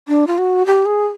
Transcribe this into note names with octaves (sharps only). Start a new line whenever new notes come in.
D4
F4
F#4
G4
G#4